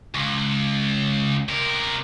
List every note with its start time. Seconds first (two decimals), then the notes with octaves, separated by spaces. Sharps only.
0.15 C#2
1.48 C3 A#4